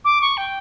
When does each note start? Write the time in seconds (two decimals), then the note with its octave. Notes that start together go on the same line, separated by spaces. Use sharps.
0.05 D6
0.22 C#6
0.37 G5